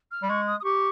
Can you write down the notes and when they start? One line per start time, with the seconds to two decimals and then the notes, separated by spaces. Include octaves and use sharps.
0.11 F6
0.22 G3
0.29 G#3 C#6
0.47 D#6
0.60 D#6
0.64 G4 C#6